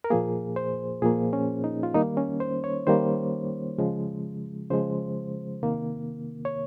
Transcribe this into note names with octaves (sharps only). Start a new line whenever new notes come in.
A#4
A#2 F3 A#3 G#4
C5
A#2 F3 A#3 G#4
C#4
D#4
F4
D#3 G3 A#3 D#4
C#4
C5
C#5
D#3 G3 A#3 C5
C#3 F3 G#3
C#3 F3 G#3 C5
C3 D#3 A#3
C#5